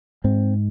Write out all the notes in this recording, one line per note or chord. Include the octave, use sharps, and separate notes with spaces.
G#2 C4